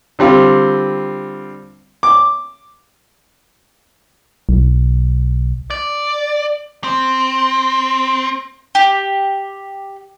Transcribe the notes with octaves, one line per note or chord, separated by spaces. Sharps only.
D3 G3 C4 F4
D6
B1
D5
C4
G4